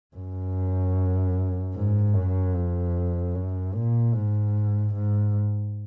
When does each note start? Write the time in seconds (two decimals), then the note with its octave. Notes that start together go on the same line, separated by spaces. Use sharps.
0.16 F#2
1.75 G#2
2.14 F#2
2.55 F2
3.35 F#2
3.75 A#2
4.14 G#2
4.94 G#2